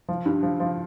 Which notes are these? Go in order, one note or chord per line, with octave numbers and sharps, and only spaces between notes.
F3
G2
F3
F3